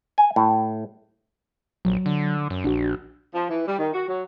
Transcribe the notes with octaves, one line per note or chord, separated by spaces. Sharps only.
G#5
A2
A#1 F#3
D3
F#2
A#1 D4 F#4
F3
E3
G3
D#3
F#4
F#3